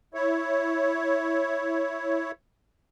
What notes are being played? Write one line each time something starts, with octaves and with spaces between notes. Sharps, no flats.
E4 C#5